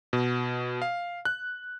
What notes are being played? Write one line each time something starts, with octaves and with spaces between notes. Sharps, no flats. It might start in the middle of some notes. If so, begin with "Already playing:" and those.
B2
F5
F#6